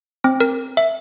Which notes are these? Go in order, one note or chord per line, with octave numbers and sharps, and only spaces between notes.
C4
A#4
E5